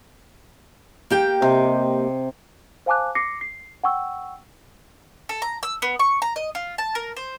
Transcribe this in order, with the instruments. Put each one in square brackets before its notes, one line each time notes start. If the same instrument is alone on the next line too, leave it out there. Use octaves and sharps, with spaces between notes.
[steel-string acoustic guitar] A#3 G4 G5
[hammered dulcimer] C3 D#5
[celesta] C5 F5 G#5 A5 D6 F#6
D6 A#6 C7 C#7
C7
F#5 G5 C#6 E6
[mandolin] A4
A#5
E6
B3
C#6
A#5
D#5
F4
A5
A#4
C5